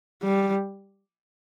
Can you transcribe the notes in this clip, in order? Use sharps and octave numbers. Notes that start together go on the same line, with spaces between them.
G3